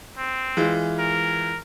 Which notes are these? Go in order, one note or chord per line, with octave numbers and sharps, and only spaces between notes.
C4
E3 G#3 F4
A#4